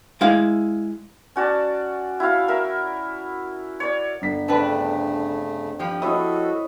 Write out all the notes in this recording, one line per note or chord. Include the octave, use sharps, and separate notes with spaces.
G#3 E4 F5
C#4 F#4 D5 A5
E4 F#4 F5
A#4 E5
C#5 D5
G1 B6
C#3 A3 C4 D4 A4 B4 D6
G2 F3 G4
E4 F#4 A4 C#5 D#5 D#6